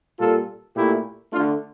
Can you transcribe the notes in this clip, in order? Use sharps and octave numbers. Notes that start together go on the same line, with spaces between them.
A#2 G3 F4 A4
A#2 A3 E4 G4
D3 A3 D4 F4